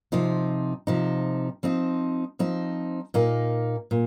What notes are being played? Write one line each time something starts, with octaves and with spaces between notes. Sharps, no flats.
C3 F3 D#4
C3 F3 D#4
F3 C4 D#4
F3 C4 D#4
A#2 A#3 D#4
A#2